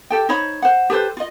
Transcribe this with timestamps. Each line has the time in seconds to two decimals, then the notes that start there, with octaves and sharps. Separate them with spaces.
0.10 G4 A4 G5
0.29 D#4 C5 C#5 B5
0.62 C5 F#5
0.90 G4 A4 B4 C5
1.17 F4 D#5